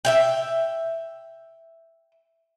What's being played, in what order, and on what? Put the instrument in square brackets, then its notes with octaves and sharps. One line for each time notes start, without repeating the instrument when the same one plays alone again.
[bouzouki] E5 F5 G5